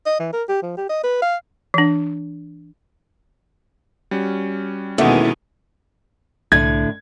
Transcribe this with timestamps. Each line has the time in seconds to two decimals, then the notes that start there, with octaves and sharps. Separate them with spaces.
0.06 D#5
0.19 E3
0.33 A#4
0.49 G4
0.62 F3
0.77 G4
0.89 D#5
1.04 B4
1.22 F5
1.74 E3 D4
4.11 G3 C#4 F#4
4.98 E2 B2 D#3 G#3 A#3 C#4 A4
6.52 C2 A2 D3 G#6